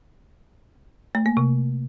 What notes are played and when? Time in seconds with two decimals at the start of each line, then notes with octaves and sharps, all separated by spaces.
1.15 A3
1.26 A#3
1.37 C3